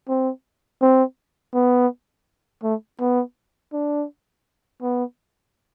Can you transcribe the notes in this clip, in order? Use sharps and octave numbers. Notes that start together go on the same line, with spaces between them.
C4
C4
B3
A3
B3
D4
B3